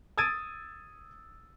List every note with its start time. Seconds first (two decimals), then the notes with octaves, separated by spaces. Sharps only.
0.18 D#6 E6 G#6 A6 D7 D#7